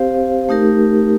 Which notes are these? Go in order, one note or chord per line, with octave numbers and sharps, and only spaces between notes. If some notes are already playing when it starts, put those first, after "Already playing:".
Already playing: C4 G4 C5 F5
A3 D#4 G4 A#4